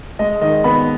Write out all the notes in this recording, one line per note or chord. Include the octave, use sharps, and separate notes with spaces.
G#3 D#5
D#3 D#5
B3 B5